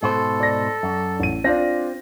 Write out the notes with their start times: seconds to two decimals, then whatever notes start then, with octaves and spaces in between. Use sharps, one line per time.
0.03 G#2 B2 A4 C5
0.40 D5 A#6
0.83 F#2
1.20 A1 D#7
1.44 C4 D4 F4 A#6